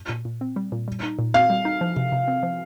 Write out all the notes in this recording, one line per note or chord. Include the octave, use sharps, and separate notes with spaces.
A#2
A#2
C4
G3
A#2
G3
D#4
A#2
C4 F5
G3
D#4
F3
C3
C3
C4
F3